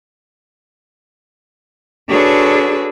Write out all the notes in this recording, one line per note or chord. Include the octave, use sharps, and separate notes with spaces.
D4 F#4 G#4 A4 B4 C#5